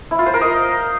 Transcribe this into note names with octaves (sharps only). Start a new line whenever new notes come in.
E4
F4
C5
A#4
D#5